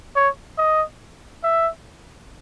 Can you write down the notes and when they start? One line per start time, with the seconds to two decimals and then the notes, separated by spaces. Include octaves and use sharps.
0.16 C#5
0.58 D#5
1.43 E5